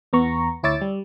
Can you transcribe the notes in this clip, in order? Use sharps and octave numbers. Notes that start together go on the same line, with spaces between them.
E2 B3 A#5 C#6
D2 E4 C#5 D6 E6 A6
G3